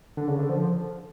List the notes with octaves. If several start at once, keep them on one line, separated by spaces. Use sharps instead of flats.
D3
C#3
D3
F3